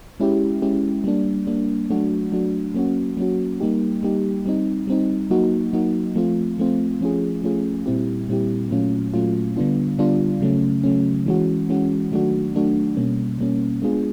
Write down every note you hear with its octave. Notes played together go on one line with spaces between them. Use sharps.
G#3 C#4 E4 G4
G#3 C#4 E4 G4
G3 A#3 D4
G3 A#3 D4
F#3 A3 D4 F#4
F#3 A3 D4 F#4
F#3 A#3 C#4 F#4
F#3 A#3 C#4 F#4
G3 A#3 D#4 G4
G3 A#3 D#4 G4
G3 C4 D#4
G3 C4 D#4
F#3 A#3 D#4 F#4
F#3 A#3 D#4 F#4
F3 A3 C4 F4
F3 A3 C4 F4
F3 A3 C#4 F4 G#4
F3 A3 C#4 F4 G#4
A#2 G3 C4 E4 G4
A#2 G3 C4 E4 G4
A#2 F#3 A3 C#4 F4
A#2 F#3 A3 C#4 F4
D3 G3 B3 D4 F4
D3 G3 B3 D4 F4
C#3 F#3 A3 C#4
C#3 F#3 A3 C#4
E3 G#3 C#4 F#4
E3 G#3 C#4 F#4
D#3 F#3 A3 D4 F#4
D#3 F#3 A3 D4 F#4
B2 G3 A#3 C#4
B2 G3 A#3 C#4
G#3 B3 D4 F4 G#4